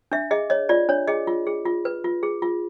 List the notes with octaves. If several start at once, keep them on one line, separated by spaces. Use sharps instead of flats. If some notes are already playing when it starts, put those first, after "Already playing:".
D4 E5
G#4 D#5
C#5 D#5
F4 D5
D4 C#5
G#4 D#5
F4
G#4
F4
B4
F4
G#4
F4